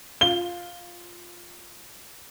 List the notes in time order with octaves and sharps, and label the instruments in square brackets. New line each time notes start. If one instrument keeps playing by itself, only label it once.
[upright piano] F4 G7